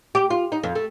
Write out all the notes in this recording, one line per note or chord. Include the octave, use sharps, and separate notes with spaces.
G4
F4
D#4
F2
A3